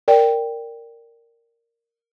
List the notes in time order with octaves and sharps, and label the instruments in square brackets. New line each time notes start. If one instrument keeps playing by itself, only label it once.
[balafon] A#4 D5 G5